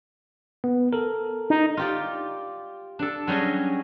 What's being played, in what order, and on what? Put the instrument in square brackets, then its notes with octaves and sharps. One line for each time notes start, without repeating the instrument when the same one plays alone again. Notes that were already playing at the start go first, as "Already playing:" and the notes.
[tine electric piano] B3
A4 A#4
[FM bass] D#4
[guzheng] F4 G4 D5
D4 A4
F#3 G3 C#4 G#4 D#5